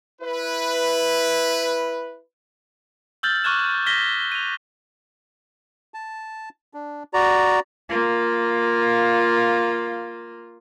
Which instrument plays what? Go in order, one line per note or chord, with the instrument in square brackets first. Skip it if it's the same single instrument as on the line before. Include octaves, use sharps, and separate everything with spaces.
[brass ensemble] E4 B4
[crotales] E6 F6 G6 A6 F#7
C#6 D6 F6 F#6 G#6 E7
F6 G#6 A#6 B6 G7
D#7 F7
[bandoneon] A5
D4
F#4 D5 A#5
[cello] A#3 F4